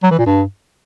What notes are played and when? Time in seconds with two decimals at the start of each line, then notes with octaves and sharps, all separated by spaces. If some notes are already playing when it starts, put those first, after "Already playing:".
0.04 F#3
0.11 E3
0.19 A#2
0.26 G2